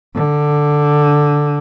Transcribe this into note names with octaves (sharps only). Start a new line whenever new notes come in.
D3